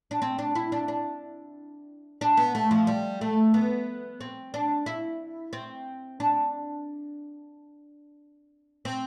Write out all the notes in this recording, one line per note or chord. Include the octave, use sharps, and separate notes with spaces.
D4
C4
D4
E4
D4
D4
D4
B3
A3
F3
G3
A3
B3
C4
D4
E4
C4
D4
C4